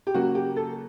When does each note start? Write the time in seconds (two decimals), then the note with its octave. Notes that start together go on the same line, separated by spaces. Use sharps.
0.07 G4
0.14 C#3 F#3 A#3 F#4
0.35 G4
0.56 A4